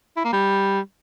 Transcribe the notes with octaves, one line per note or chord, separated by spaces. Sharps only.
E4
A#3
G3